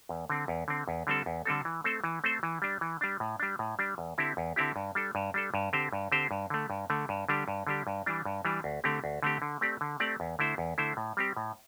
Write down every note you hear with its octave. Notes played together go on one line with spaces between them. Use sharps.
E2
D3 C4
E2
D3 C4
E2
D3 G3 C4 A4
E2
D3 G3 C4 A4
E3
A3 C4 A4 C5
E3
A3 C4 A4 C5
E3
G3 D4
E3
G3 D4
A2
G3 D4
A2
G3 D4
E2
D3 C4 E4 G4
E2
D3 C4 E4 G4
G2
G3 D4 A4
G2
G3 D4 A4
G2
D3 C4 G4 C5
G2
D3 C4 G4 C5
G2
D3 A3
G2
D3 A3
G2
D3 G3 D4 G4
G2
D3 G3 D4 G4
G2
E3 G3 D4
G2
E3 G3 D4
D2
D3 A3 C4 G4
D2
D3 A3 C4 G4
D3
A3 C4 G4 D5
D3
A3 C4 G4 D5
E2
D3 A3 E4 C5
E2
D3 A3 E4 C5
A2
G3 C4 G4
A2